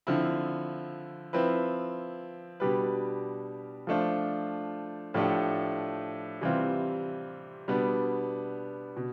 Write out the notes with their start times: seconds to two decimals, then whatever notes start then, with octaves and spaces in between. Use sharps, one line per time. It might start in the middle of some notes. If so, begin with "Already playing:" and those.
0.07 D3 F3 C4 E4
1.33 F3 C4 E4 B4
2.60 B2 G3 D4 G4 B4
3.87 F3 A3 D4 F4 C5
5.14 A2 F3 A3 D4 G4
6.41 C3 E3 G3 C4 F4
7.68 B2 G3 B3 D4
8.97 B2